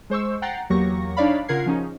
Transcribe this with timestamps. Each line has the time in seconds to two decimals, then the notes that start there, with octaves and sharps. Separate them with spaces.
0.10 G#3 C5 C#6 E6
0.42 F#5 G5 A#5 A6 C7
0.70 E2 F#3 A#3 G4 C#6 A#6
1.17 D4 D#4 C#5 D5 F5 B5
1.48 C#3 F4 A#4 F#5 G#6 C7
1.66 F3 C#4 D#4 G#4